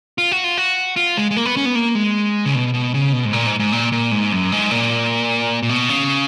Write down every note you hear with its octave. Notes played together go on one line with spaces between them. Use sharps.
F4
F#4
F4
F#4
F4
G#3
G#3
A#3
B3
C#4
B3
A#3
G#3
C#3
B2
B2
C#3
B2
G#2
A#2
G#2
G#2
A#2
A#2
G#2
F#2
G#2
A#2
A#2
B2
C#3